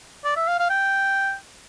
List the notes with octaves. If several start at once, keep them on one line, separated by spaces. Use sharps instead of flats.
D5
E5
F5
F5
G5